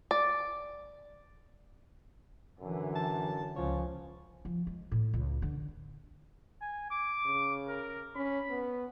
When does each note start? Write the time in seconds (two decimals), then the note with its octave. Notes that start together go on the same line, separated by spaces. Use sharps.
0.11 D5
2.60 F#2 D3 E3
2.95 A5
3.56 C#2 C#3 F3 C#5
4.45 F3
4.67 G#3
4.92 A2
5.13 C#2
5.42 D3
6.61 G#5
6.91 D6
7.25 C#3
7.68 A#4
8.15 C#4 B5
8.50 B3